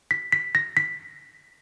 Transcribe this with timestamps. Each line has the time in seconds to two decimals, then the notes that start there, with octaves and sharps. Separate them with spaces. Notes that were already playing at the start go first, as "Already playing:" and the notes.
0.11 B6
0.32 B6
0.55 A#6
0.77 B6